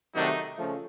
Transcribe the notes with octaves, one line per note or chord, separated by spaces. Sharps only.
C3 D#3 F#3 A3 D4 D#4
C#3 F3 A3